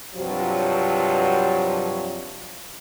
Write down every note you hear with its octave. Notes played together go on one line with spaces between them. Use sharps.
G2 C3 F3 F#3